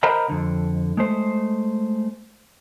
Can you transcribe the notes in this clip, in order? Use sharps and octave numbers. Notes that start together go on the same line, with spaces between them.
A#4 C5 D#5 F#5 A#5 B5
F2 D3
G#3 A3 C5